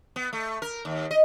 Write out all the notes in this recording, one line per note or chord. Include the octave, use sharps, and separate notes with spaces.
B3
A3
A#4
D#2
D#5